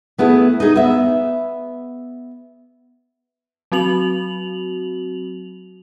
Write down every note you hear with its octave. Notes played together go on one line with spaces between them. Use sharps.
A3 B3 E4 G#4
D#4 G#4
B3 E5
F#3 C4 F#4 F7 F#7